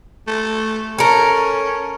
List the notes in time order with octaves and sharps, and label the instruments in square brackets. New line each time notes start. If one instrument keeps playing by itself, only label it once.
[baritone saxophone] A3
[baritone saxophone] C#4 [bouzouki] A4 A#4